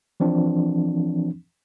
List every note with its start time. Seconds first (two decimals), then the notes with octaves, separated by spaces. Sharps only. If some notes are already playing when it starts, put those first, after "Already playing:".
0.20 E3 F3 C4 D4